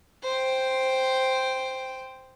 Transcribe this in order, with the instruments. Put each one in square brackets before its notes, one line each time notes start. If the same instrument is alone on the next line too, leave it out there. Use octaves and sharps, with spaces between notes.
[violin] C5 G5